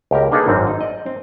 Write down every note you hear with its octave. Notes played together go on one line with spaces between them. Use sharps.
C#2 G4 A#4
A#3 D4 D#4 G#4 A4 B4
G#1 F#2 C4
D#4
D5 D#5
C4